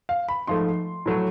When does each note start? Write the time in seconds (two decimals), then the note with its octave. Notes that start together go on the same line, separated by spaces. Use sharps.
0.09 F5
0.29 B5
0.47 G#2 F3 A3 C6
1.06 A2 F#3 A3